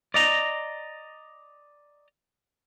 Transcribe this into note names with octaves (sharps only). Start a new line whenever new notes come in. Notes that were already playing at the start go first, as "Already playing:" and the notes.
D5 D#5 A#5